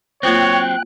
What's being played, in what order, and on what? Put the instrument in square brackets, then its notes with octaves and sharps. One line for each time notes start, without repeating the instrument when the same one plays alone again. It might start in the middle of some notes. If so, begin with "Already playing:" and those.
[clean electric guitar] F#3 C4 [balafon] A#3 F4 C5 [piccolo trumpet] C#5 [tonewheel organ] G5 F#6